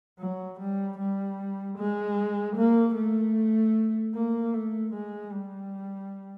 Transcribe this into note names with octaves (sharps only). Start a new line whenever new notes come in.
F#3
G3
G3
G#3
A#3
A3
A#3
A3
G#3
G3